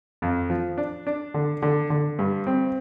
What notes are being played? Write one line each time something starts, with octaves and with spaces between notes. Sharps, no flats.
F2
F3
D4
D4
D3
D3
D3
G2
C4